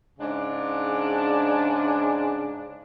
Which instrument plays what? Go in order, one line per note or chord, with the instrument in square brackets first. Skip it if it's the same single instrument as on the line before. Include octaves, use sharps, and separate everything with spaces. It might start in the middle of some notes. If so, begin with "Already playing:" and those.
[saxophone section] G#2 C#3 D4